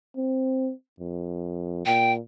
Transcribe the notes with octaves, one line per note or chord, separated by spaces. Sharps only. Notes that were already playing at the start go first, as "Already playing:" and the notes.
C4
F2
A#2 G5